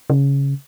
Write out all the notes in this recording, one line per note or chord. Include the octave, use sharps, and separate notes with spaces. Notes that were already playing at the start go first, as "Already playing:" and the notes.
C#3